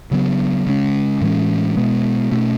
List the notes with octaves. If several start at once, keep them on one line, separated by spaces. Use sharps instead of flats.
C#3 F#3 B3
C#3 G#3 C#4
A2 E3 G#3 C#4
B2 G#3 B3
B2 A3 C#4